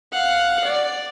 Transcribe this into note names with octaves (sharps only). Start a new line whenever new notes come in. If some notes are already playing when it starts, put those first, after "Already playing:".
F5 F#5
D5